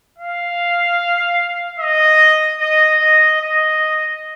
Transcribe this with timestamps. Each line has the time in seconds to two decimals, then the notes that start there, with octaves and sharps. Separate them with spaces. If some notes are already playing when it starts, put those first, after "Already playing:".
0.18 F5
1.80 D#5
2.60 D#5
3.01 D#5
3.41 D#5